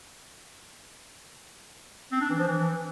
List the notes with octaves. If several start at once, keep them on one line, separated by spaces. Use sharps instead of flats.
C4
D4
E3
F3
E3